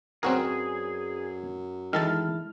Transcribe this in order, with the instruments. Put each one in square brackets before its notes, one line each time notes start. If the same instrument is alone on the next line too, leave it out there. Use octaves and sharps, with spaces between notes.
[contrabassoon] F#2 [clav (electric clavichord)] C4 F#4 A#4 [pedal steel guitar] G#4 [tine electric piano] B4 D5
[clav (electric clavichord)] D#3 A4 A5 [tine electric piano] E3 G#3 E4 [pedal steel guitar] F6